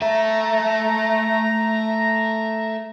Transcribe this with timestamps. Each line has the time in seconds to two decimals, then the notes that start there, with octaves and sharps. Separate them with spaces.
0.02 A3 E5 A#5